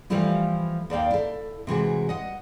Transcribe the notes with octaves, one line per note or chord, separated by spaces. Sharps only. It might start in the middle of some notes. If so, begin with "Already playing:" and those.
E3 F3 G3 A3 E4 F4
D#2 D5 F5 G5
E4 A4
C3 E3 G#3 F#4
D#5 F#5